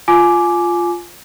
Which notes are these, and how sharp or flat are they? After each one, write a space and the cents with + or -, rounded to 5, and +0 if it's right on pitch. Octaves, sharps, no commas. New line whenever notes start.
F4 -5 G#5 +20 D6 +0